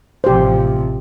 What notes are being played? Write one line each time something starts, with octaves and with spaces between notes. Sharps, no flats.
A1 C3 F3 G4 C5